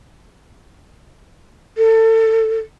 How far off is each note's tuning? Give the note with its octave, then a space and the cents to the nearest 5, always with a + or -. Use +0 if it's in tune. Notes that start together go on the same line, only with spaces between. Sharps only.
A4 +25